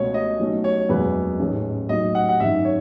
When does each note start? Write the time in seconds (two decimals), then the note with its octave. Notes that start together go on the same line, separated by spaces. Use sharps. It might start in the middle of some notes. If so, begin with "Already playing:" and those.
Already playing: C#2 B2 A3 C#4 C#5
0.14 D#5
0.40 B1 B2 A3 C#4
0.64 C#5
0.89 F#1 E2 B2 G#3 B4
1.39 A1 G#2 D#3 G#3 C#4
1.89 B1 A2 F#3 D#5
2.15 F#5
2.29 F#5
2.39 G#1 F#2 D#3 E5
2.65 C#5